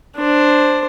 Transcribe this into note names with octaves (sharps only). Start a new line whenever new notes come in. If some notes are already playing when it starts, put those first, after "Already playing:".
D4 C5